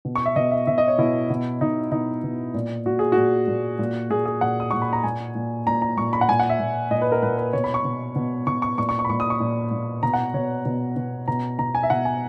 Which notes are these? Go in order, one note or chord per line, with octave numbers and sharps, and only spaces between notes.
B2
C#6
E5
B2 D#5
E5
B2 E5
D#5
C#5
B2 E4
B2
B2 D#4
B2 D#4
B2
A#2
A#2 F#4
G#4
F#4
A#2
A#2
A#2
A#2 G#4
G#4
A#2 F#5
D#6
A#2 C#6
B5
A#5
A#2 G#5
A#2
A#2 A#5
A#5
A#2 C#6
B5
F#5
A#2 G#5
F#5
E5
A#2
A#2 D#5
B4
A#4
A#2 B4
B4
B2 C#5
B5
C#6
B2
B2
B2 C#6
C#6
A#2 C#6
C#6
C#6
B5
A#2 C#6
D#6
C#6
A#2
A#2
B2 A#5
F#5
B2 C#5
B2
B2
B2 A#5
B2 A#5
G#5
E5
B2 F#5
G#5